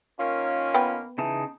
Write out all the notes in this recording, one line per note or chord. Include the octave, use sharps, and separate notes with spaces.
D#3 A#3 C#4 F4
B3 B4 G5
C#3 E3 D#4 A5